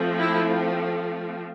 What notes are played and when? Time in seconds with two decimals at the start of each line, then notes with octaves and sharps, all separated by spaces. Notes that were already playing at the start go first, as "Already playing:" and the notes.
Already playing: F3 A3 C4
0.18 E4